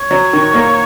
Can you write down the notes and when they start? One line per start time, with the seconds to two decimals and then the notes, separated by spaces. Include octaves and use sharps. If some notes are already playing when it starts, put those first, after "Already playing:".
Already playing: C#5
0.11 F#3
0.33 D#3
0.54 A#3